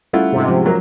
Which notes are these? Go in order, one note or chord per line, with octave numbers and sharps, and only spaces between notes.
G3 A3 C#4 E4 F4 F#5
G#2 C3
F3
F#3 A#3